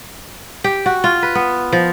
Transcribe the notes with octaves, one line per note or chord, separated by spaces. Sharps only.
G4
F#4
F4
B4
B3
F3